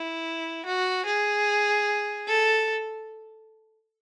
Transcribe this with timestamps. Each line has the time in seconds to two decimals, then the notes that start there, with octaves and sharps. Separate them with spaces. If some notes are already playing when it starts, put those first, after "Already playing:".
Already playing: E4
0.66 F#4
1.06 G#4
2.28 A4